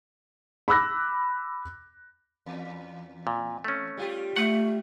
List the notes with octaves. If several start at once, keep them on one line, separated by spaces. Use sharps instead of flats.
B5 D6 E6 F#6 A#6
E2
A#2
A3 C#4
G3 F4 G4
A3 F#5